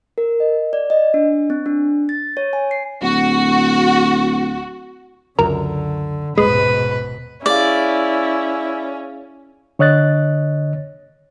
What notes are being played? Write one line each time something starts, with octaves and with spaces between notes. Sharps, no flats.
A#4
D#5
D5
D#5
D4
C4
D4
A6
C#5
G#5
C7
D1 F#4
C#2 F#2 D3 A#4
D#1 G#2 B2 G#3 B4
C#4 E4 G#4 D5 F5
D3 C#5 D#5 F#6 A6